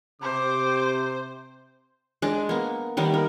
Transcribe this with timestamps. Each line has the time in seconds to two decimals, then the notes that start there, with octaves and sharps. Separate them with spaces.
0.22 C3 C5 D6
2.22 G#3 D4
2.49 A#3 B3
2.97 D#3 G3 A#3 B3
3.14 A#4